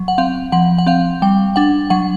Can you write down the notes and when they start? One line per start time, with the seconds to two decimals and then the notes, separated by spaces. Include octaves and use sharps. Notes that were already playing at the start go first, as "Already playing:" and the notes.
Already playing: F#3
0.08 F#5
0.18 C4 F5
0.52 F3 F#5
0.78 F#5
0.86 C4 F5
1.22 G3 G5
1.56 D4 F#5
1.90 F#3 F#5